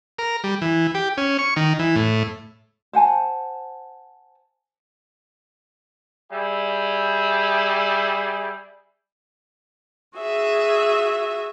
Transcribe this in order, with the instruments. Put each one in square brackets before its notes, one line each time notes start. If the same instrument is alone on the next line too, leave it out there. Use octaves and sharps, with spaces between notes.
[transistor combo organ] A#4
G3
E3
G4
C#4
C#6
D#3
E3
A2
[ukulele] C5 F#5 G#5 A5
[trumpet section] G3 G#4 E5
[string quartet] F#4 G#4 E5